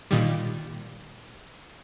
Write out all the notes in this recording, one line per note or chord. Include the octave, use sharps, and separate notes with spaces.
A#2 D#3 G3